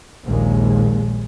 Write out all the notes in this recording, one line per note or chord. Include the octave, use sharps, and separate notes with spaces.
A#1 D#2 A#2 G#3